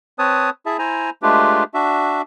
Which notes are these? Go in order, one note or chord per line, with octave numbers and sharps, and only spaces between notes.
C4 B4 C#5 A5 D#6
E4 G#4 E5 A5
E4 C5 G#5 A#5
G#3 A3 D4 F4 G4 B4
D4 F#4 E5